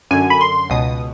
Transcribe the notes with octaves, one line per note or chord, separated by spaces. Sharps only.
F#2 D3 G#5
B5
C6
C#2 B2 D#6